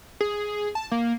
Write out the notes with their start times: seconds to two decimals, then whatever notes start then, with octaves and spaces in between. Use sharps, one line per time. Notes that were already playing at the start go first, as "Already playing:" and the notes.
0.21 G#4
0.75 A5
0.92 A#3